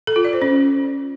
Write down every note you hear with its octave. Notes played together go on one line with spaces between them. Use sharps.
A4
F4
D5
C5
C#4